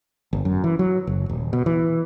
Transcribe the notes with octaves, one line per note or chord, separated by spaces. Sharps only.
G1
F#2
E3
F#3
F#1
D#1
B2
E3